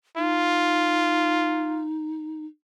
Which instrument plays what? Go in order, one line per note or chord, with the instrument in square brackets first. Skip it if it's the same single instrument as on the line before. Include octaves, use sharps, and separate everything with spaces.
[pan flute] D#4 [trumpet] F4